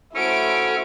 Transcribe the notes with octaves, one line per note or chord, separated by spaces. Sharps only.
A3 C#4 E4 F#4 A4 C5 F#5 D7